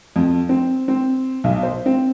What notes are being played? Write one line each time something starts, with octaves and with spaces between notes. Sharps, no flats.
F2
C4
C4
B1
C5
C4